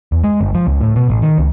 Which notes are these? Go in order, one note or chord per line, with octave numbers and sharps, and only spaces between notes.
E2
G#3
G1
F3
C#2
A2
B2
A1
D#3
C#2